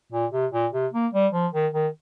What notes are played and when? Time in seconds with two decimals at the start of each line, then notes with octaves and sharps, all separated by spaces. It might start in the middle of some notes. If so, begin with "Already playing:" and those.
0.12 A#2
0.32 C3
0.53 A#2
0.73 C3
0.93 A#3
1.13 G3
1.33 F3
1.53 D#3
1.74 D#3